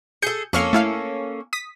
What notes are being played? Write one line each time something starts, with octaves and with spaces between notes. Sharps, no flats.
G#4 A4 G6 C#7
F2 A#3 C#4 A4 C#6 F6
A3 E4 F5
D#6 B6